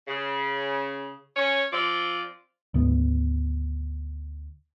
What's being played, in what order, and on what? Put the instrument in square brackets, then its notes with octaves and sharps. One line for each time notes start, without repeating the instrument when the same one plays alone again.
[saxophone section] C#3
C#4 C#5
F3 C4 F4 D5
[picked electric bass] D2 G#2 D#3 B3